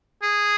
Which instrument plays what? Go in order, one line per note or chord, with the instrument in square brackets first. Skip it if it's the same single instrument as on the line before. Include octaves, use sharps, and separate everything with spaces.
[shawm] G#4